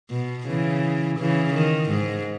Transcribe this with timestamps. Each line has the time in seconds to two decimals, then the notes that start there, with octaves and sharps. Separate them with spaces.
0.11 B2
0.47 C#3 E3
1.18 C#3 E3
1.54 D#3
1.90 G#2